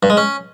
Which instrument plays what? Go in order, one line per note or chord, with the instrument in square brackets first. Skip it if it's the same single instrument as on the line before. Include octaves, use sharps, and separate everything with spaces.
[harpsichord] G2
G#3
C#4